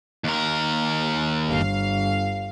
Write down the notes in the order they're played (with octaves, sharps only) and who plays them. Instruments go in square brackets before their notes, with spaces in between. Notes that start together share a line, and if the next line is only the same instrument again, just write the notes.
[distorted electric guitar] D#2 A#4
[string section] G1 F5